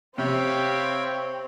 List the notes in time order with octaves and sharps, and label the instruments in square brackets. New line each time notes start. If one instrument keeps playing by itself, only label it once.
[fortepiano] C3 [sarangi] C4 [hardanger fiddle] G4 F5 [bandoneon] C#5 G5 B5